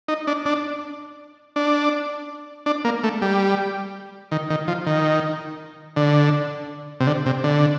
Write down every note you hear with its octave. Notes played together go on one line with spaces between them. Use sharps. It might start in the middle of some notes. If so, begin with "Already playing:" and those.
D#4
D4
D4
D4
D4
A#3
A3
G3
D#3
D#3
F3
D#3
D3
C3
D3
C3
D3